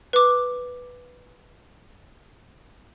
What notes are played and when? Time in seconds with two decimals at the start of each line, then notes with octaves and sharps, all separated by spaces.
0.13 B4 D6